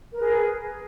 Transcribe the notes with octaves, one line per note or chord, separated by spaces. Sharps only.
G#4 A#4 B4